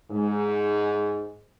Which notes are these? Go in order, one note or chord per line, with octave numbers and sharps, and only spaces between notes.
G#2